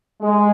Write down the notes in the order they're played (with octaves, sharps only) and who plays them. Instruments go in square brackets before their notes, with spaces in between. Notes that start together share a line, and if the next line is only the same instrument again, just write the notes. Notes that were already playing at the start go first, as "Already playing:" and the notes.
[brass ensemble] G#3